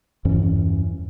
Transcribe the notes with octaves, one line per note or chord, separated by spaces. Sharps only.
E2 G2 E3 C#4